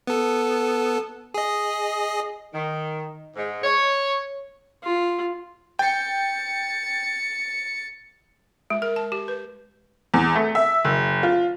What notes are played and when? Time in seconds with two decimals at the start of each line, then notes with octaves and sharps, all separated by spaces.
0.07 B3 A4
1.34 G#4 D#5
2.54 D#3
3.36 G#2
3.64 C#5
4.84 F4
5.79 G5 A6 C#7
8.70 G#3
8.82 A#4
8.96 A5
9.12 G4
9.28 B4
10.14 E2
10.35 A3
10.55 E5
10.84 F#1
11.23 F4